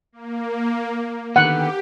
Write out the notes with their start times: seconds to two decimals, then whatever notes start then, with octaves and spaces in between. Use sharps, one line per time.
0.12 A#3
1.36 D3 D#3 B3 G4 F#5